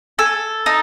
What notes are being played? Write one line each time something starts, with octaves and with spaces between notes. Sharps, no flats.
A4 G#5
D#4 A5